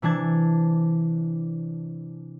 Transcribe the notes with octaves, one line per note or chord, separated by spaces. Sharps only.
C3 E3 D4 A5 G#6